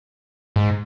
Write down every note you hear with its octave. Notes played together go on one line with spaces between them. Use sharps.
G#2